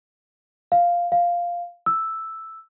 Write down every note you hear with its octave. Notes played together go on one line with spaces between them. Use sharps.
F5
F5
E6